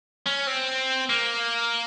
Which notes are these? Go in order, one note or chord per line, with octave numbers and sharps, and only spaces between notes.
C#4
C4
A#3